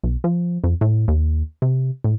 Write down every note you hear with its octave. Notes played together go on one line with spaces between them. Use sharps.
B1
F3
F2
A2
D#2
C3
A2